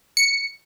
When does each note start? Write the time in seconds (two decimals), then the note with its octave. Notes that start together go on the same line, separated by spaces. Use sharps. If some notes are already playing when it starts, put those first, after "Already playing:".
0.17 C#7